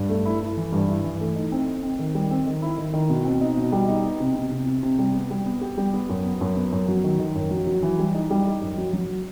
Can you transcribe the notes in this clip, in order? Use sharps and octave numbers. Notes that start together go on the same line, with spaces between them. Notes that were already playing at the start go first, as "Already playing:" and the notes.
Already playing: G2
A3
E4
E4
E3
G2
E4
E3
A3
D#4
C4
C4
C4
D#3
G3
C4
D#3
E4
D#3
D#3
B2
C4
D#4
B2
G3
D#4
B3
C3
C3
C3
C3
C3
G3
B3
G3
B3
G4
G3
B3
F#2
B3
F#2
B3
F#2
F#3
D#3
D#3
F#2
F#3
F#3
E3
G3
D#4
G3
D#4
F#2
F#3
F#3